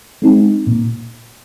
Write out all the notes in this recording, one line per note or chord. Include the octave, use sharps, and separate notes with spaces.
G#3 C4 D#4
A#2